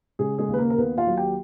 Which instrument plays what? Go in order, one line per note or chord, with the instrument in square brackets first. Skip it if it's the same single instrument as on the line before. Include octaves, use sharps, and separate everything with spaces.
[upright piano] C#3 G#3 G#4
G#3 G#4
D#2
B4
A#3 A#4
A#4
D#2 B3 B4
F4 F5
F#3
G4 G5